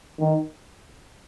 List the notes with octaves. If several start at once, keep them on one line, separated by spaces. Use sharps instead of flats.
D#3